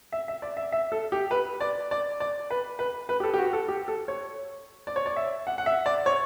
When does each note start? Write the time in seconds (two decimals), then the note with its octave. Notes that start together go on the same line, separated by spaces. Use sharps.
0.12 E5
0.28 E5
0.42 D5
0.57 E5
0.72 E5
0.92 A4
1.12 G4
1.31 B4
1.60 D5
1.91 D5
2.20 D5
2.50 B4
2.79 B4
3.09 B4
3.20 G4
3.23 A4
3.34 G4
3.38 F#4
3.53 A4
3.68 G4
3.88 A4
4.08 C#5
4.87 D5
4.96 C#5
5.06 D5
5.16 E5
5.47 F#5
5.58 F#5
5.66 E5
5.86 D5
6.06 C#5